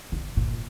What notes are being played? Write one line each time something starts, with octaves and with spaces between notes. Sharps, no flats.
C#3
A#2